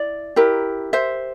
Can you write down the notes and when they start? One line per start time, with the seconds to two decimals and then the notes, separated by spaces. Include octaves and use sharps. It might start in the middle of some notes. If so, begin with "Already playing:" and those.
Already playing: E4 D5
0.36 E4 G4 A#4
0.93 C5 E5